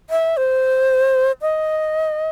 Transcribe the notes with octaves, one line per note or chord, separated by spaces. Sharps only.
E5
C5
D#5